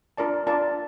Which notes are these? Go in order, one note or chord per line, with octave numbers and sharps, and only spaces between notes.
D4 F4 A#4 D5 A5
D4 F4 A#4 D5 A5